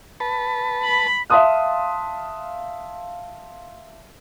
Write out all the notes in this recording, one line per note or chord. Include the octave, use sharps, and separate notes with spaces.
B4 A5
B5
E5 F5 A5 C6 D#6 F#6